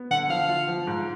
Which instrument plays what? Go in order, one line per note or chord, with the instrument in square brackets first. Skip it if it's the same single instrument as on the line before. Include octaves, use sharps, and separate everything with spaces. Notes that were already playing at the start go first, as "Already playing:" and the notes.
Already playing: [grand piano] B3
[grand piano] D3 [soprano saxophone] F#5
[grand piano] F3 [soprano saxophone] F5
[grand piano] F4
F3
G#2